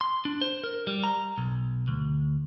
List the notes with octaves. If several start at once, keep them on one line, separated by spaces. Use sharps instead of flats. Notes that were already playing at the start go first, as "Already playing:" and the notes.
C6
D4
C5
A#4
G3
A#5
B1
D2